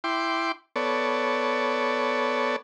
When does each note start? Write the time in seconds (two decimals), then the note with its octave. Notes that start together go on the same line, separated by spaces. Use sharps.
0.04 E4 G5 C6 D6
0.76 B3 A4 C#5 D5